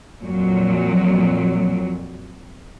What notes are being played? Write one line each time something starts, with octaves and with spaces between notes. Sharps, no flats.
F2 A#2 F#3